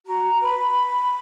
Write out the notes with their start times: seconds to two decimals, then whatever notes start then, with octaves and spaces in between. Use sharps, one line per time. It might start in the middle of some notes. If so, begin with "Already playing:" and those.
0.06 F#4 A#5
0.41 B4 B5